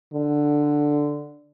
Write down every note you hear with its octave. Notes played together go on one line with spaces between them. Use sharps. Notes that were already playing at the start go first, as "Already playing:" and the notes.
D3